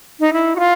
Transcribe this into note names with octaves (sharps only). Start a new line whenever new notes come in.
D#4
E4
F#4
F4